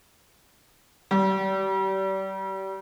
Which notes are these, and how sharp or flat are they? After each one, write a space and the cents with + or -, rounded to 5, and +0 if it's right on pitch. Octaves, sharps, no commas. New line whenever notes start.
G3 -35